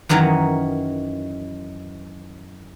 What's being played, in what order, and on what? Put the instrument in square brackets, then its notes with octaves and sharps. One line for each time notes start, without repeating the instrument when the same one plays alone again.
[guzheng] F#2 D#3 E3 F#3 C#4 A#5